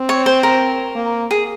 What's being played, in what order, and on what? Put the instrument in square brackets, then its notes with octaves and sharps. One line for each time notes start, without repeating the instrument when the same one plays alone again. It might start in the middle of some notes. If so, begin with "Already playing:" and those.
Already playing: [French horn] C4
[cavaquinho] C#5
C5
A#4
[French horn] A#3
[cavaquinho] G#4